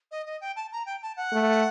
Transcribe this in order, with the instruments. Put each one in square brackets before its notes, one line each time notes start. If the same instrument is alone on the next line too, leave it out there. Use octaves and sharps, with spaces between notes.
[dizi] D#5
D#5
G5
A5
A#5
G5
A5
F#5
[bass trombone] A3